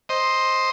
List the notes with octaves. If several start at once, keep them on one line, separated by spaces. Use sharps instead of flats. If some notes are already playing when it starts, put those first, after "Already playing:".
C5 D#5